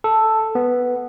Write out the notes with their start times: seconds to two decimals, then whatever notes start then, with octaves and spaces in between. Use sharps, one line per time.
0.04 A4
0.55 B3